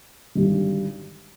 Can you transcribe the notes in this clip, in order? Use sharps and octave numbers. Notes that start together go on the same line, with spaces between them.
G#1 G2 D3 G3